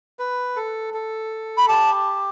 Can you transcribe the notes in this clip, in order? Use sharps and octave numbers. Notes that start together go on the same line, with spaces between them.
B4
A4
A4
B5
G4 A5